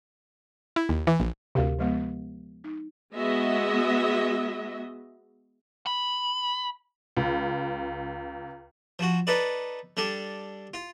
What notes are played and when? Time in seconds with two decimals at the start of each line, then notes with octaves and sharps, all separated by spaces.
0.76 E4
0.89 D#2
1.07 E3
1.20 A#1
1.55 D2 C3 G4 A#4 F5
1.79 F3 G#3 B3
2.64 D#4
3.14 G#3 B3 F#4 D#5 E5
5.87 B5
7.17 C#2
8.99 F3 F#4
9.27 D#4 A4 B4 D5
9.97 G3 D4 A4
10.74 F4